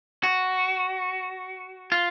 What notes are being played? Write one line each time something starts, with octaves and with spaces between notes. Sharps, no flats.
F#4
F4